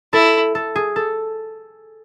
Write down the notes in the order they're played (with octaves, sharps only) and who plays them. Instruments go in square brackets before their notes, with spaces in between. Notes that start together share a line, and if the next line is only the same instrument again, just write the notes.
[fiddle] E4 [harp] A4
[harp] A4
G#4
A4